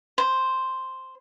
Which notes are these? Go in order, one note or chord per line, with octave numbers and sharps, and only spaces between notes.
C5